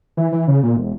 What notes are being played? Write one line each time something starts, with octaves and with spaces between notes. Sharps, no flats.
E3
E3
C#3
A#2
E1